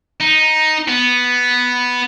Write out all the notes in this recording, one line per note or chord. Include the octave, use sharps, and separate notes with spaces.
D#4
B3